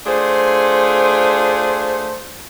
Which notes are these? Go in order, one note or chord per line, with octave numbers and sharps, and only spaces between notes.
A3 D4 F4 G#4 C5